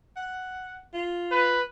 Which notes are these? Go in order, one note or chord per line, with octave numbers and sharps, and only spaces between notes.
F#5
F4
B4